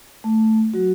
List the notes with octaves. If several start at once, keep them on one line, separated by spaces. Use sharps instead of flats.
A3
F#3 F#4